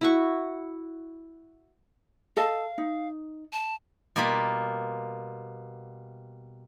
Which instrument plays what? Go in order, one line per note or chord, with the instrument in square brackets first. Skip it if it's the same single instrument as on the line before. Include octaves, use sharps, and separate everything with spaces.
[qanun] E4 F#4 C#6
[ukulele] A4 D#5 A5 [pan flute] F5
[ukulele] D#4
[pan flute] A5
[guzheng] B2 G3 A#3 F4 B5